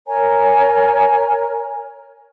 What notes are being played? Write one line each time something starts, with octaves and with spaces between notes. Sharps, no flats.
A#4 C#5 G#5 A#5